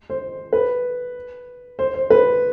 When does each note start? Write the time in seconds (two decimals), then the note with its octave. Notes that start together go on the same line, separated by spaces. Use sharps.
0.10 C5
0.53 B4
1.79 C5
1.94 C5
2.10 B4